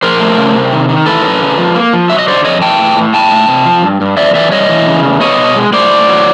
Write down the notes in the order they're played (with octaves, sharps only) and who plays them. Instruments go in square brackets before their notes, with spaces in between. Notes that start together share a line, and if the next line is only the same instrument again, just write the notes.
[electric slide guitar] F3 A#4 C5
A3
C#3
C3
D#3
D#3
E3 A4 B4
F#2
C#3
F3
A#3
F3
F#3 E5
D#5
D3 C5 D5
F2 C#5 D#5
E3 G5 A5
A2
A2
A3 G5 A5
A3
C3
F3
G2
G2
F2 D5 E5
E3 D5 E5
G3 C#5 D#5
E3
C#3
E2
B3 C#5 D#5
B2
G#3
A2 C5 D5
A2
F#3